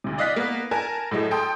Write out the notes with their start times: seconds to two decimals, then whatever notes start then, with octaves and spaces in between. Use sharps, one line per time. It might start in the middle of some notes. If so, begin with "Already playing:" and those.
0.04 D2 C3
0.18 D5 D#5 F5 D#6 F#6 B6
0.36 A#3 B3
0.71 A#4 G#5 A5
1.11 A2 F#3 G#3 A3
1.31 A4 G5 C6 D#6